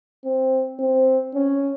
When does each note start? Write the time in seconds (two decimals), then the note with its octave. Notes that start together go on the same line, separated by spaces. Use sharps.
0.24 C4
0.79 C4
1.34 C#4